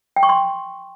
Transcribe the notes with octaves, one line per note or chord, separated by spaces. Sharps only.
G5
C#6
C6